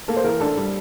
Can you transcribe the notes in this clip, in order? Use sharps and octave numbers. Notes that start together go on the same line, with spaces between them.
A#3 A4
C5
E3 A#4
D4 A4
G3